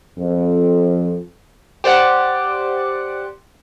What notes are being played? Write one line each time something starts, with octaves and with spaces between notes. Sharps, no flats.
F2
G4 C5 D5 F#5